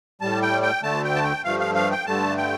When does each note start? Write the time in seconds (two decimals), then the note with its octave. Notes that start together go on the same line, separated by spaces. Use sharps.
0.21 A2 G3 A5
0.42 G5
0.62 G5
0.83 D2 D3 A3 A5
1.04 G5
1.15 A5
1.24 G5
1.44 G2 F3 A3 F5
1.59 F5
1.75 F5
1.91 G5
2.06 G2 D3 A3 A5
2.37 G5